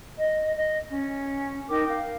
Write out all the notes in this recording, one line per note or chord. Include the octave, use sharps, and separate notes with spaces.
D#5
D#5
C#4
D#4 A#4 G5 D6
F5